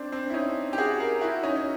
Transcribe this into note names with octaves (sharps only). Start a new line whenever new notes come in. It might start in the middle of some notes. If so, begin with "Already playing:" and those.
Already playing: C4 D4
C4 D4
E4
C#4 D#4
G4
F#4 G#4
G#4 A#4
E4 F#4
C#4 D#4
C#4